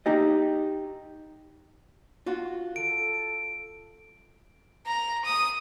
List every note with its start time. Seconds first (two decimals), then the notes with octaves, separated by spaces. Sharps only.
0.06 D#4 G4 D#5
2.26 F4 F#4
2.76 A4 D7
4.86 A#5
5.25 D#6